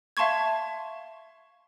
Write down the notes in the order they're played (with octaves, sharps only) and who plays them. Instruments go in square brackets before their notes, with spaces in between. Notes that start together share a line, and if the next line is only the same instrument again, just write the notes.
[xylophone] E5 F5 A5 C6 C#6 G#6